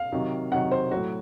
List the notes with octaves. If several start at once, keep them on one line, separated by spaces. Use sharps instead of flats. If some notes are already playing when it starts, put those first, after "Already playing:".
Already playing: F5
C3 D#3 F#3
C3 D#3 F#3 F#5
C5
A2 F#3 F#4